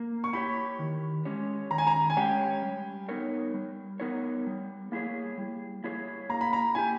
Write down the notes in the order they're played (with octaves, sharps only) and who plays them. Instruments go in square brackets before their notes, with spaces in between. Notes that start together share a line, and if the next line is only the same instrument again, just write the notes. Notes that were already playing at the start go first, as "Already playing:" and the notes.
Already playing: [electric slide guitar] A#3
[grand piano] C#6
[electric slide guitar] E4 G4 C#5 [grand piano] B5
[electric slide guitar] D#3
G#3 C#4 G4 C#5
[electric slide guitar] D#3 [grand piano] A#5
[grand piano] G#5
A#5
G#5
[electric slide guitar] G#3 C#4 G4 C#5 [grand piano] G5
[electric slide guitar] G3
B3 D#4 A#4 C#5
G3
B3 D#4 A#4 C#5
G3
A#3 E4 G#4 C#5
G3
A#3 E4 G#4 C#5
[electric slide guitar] A#3 [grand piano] A#5
[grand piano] B5
A#5
[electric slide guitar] E4 G4 [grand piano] G#5